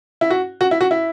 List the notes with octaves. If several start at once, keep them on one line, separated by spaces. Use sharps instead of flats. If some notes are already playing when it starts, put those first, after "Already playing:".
E4
F#4
F#4
E4
F#4
E4